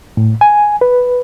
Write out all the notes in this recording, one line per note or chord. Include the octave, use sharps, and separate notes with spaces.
A2
G#5
B4